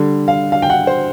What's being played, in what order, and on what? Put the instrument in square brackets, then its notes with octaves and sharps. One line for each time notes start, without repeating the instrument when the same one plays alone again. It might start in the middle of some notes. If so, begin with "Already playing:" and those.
Already playing: [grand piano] D3 G3
F5
F5
G5
F#5
C5